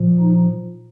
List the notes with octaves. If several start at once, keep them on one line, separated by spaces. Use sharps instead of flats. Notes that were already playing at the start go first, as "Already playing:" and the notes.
Already playing: A#2 F3
D#4